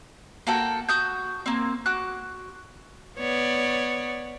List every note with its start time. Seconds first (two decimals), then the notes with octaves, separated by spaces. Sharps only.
0.47 A#3 F#4 A4 G5
0.89 F#4 D#6 G6
1.46 A#3 C4
1.86 F#4 D6 F#6
3.18 B3 C#5 D5